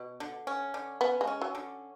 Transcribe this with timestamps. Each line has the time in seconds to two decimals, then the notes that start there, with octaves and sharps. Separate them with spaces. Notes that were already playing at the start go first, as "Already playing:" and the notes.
Already playing: B2
0.20 D3
0.47 C#4
0.74 D3
1.01 B3 C#4
1.21 G#3
1.27 C#4
1.42 F#3
1.55 D3